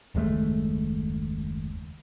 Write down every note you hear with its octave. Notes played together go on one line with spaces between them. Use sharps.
F#1 D#2 G#3 A3